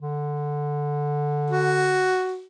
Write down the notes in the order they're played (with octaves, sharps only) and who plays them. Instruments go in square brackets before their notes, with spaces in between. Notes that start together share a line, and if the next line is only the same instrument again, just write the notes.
[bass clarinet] D3
[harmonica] F#4